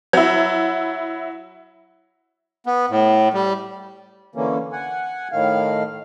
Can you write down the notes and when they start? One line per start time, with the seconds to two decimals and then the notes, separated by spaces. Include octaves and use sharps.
0.13 F#3 E4
2.66 B3
2.90 A2
3.33 G3
4.35 D3 E3 A#3 C#4
4.73 F#5 G#5
5.32 A2 D#3 F5